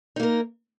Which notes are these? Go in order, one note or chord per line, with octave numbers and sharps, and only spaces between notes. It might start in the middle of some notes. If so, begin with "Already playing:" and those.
A#3 D#4 A#4